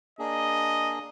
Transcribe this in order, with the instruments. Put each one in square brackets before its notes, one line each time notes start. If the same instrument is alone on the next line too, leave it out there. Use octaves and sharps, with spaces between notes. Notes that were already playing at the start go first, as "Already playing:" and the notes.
[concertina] A#3 D4 G#4 [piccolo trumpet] D#5